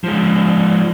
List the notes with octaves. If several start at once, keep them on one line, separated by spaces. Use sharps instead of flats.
F3 G#3